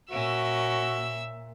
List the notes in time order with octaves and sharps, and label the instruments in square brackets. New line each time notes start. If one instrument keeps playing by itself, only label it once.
[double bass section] A#2 [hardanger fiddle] C#4 A#4 [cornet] F#4 [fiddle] E5 E6